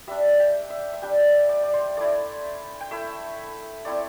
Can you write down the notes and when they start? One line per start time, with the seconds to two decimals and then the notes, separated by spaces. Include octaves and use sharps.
0.07 G3 D4 E5
0.40 G5
0.70 E5
0.93 E5
1.02 G3 D4 G5
1.49 D5
1.63 D5
1.73 C5
1.97 A3 E4 D5
2.81 G5
2.91 A3 E4 E5
3.85 A3 C4 E4 D5